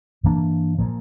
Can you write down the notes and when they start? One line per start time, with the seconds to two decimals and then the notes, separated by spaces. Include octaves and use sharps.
0.23 G2 E3 A#3 D4
0.78 A#2 F3 A#3